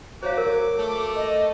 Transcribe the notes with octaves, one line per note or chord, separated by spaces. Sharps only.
F#3 C5 C#5 F5 D6
A#4
A3
D#5